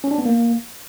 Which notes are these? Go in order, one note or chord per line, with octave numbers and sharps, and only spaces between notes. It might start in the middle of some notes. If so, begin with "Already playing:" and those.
C#4
D4
B3
A#3